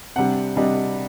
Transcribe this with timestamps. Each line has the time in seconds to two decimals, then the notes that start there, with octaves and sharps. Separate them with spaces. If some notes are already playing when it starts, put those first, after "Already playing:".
0.16 C3 G3 D4 F#5
0.56 C3 G3 D4 D#5